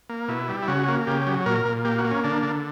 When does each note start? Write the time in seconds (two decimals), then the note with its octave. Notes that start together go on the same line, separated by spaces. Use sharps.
0.10 A#3
0.28 B2 E4
0.49 G3
0.62 E4
0.68 C#3 F#4
0.88 A#3
1.07 C#3 G4
1.27 F#3
1.46 A#2 A#4
1.65 A#2
1.85 A#3 G4
1.98 F#4
2.05 A#3
2.11 C#4
2.24 D3 D4
2.43 D3